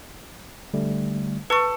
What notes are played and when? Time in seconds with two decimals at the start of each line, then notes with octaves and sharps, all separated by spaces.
0.74 D3 G3 A3
1.50 A4 B4 C#6